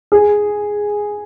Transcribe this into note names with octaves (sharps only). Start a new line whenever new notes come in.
G#4